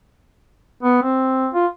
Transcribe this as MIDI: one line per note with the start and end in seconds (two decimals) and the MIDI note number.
0.83 1.03 59
1.03 1.48 60
1.54 1.67 65